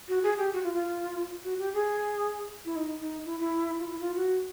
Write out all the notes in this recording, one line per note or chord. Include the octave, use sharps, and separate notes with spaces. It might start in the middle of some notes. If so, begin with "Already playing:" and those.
F#4
G#4
G4
F#4
F4
F4
F#4
G4
G#4
E4
D#4
D#4
E4
E4
F4
E4
F4
F#4